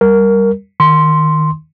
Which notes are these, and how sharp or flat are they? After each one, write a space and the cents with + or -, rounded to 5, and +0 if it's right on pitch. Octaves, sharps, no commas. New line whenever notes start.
G3 +0 A#4 +0
D#3 +0 C6 +0